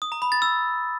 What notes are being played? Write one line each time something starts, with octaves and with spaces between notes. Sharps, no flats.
D#6
A#5
B5
A6
E6